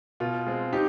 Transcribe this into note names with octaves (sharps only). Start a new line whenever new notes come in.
B2 F4
G#3 C4
D#4 G4